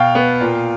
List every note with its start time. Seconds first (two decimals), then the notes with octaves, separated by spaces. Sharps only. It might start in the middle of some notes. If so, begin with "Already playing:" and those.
Already playing: B2 F5 G5
0.15 B3
0.41 A#2